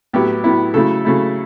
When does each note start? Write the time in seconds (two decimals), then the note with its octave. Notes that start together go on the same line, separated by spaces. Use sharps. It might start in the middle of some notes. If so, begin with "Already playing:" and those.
0.13 A2 F#3 B3 E4 G4
0.44 A2 F#3 B3 E4
0.74 C#3 F#3 A3 E4 A4
1.05 C#3 F#3 A3 E4